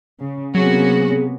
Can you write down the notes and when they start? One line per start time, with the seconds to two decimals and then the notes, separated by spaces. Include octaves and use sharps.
0.19 C#3
0.55 C3 F#3 A#3 B3 C#4 F#4 G#4